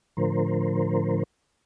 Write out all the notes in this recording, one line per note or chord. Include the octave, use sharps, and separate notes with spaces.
A2 D3 F3 A#4 C5